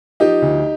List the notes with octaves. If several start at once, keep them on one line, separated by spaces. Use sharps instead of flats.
F3 D#4 G4
D2